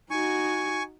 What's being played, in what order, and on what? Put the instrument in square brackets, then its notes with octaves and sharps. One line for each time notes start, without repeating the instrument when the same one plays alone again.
[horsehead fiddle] D#4 F#4 [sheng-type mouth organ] G#5 C#6